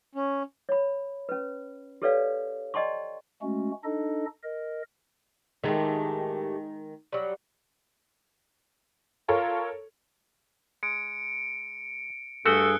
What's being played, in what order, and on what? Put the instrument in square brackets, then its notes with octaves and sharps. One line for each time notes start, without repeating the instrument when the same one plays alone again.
[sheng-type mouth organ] C#4
[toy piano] C#5 B5
C#4 B4
G4 A4 B4 C#5 D5 F5
D5 D#5 G5 A5 C6 C#6
[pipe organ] G#3 A3 C#4 F#4
D4 D#4 A4 D#5
A#4 D#5
[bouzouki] A2 A3 G4 [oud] D#3 G#3
[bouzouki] F#3 G3
[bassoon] F4 [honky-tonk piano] A4 A#4 C#5
[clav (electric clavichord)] G#3 [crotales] C#7 D7
[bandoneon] G2 G#4 [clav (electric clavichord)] A3 F#4 [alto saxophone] A4 [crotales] F#6 C#7 G7